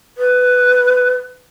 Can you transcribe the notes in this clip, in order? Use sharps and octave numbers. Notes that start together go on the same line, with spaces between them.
B4